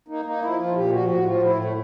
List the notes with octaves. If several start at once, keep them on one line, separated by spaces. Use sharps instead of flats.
A#3 D#4
A#3 D#4
F3 E4
F3 F4
A#2 G4
F3 F#4
A2 F#4
F3 F4
A2 E4
A3